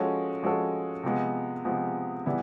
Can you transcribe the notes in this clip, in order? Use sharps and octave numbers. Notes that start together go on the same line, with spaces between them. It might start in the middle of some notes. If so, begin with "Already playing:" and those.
Already playing: F3 G#3 C#4 F#4 A4
F3 G#3 C#4 F#4 A4
C3 F3 G#3 B3
C3 F3 G#3 B3
E3 G3 B3 E4